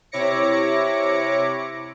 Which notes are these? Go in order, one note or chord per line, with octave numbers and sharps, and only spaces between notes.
C3 E4 C#5 D6 A#6 C#7